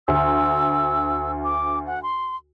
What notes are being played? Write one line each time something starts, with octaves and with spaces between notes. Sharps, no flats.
D2 E6
D6
F#5
C6